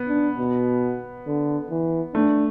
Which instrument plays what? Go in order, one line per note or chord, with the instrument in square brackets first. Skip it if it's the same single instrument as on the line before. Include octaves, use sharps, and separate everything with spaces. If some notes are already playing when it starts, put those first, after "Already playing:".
Already playing: [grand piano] B3
[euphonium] D4
B2
D3
E3
[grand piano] A3 [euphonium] D4